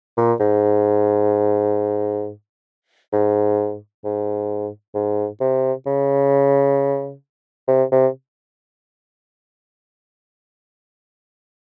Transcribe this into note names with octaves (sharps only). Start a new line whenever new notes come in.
A#2
G#2
G#2
G#2
G#2
C3
C#3
C3
C3